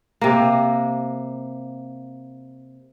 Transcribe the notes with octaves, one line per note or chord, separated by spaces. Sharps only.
C3 A#3